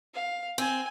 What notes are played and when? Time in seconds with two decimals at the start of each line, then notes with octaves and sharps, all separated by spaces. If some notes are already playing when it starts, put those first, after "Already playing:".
0.14 F5
0.58 C4 G#5